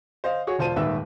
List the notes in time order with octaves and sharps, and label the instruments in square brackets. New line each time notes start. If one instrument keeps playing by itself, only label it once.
[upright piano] C5 D#5 F5
F#4 G#4 C#5
E1 F4 C5 A5 D#7
D#1 D#2 G#2 B4 E5 E6